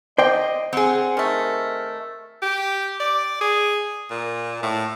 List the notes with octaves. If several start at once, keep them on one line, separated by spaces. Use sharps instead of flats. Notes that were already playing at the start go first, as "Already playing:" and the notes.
C5 D5 D#5 G5
C4 G#4 F#5
D#3 A3 A#4
G4
D5
G#4
A#2
A2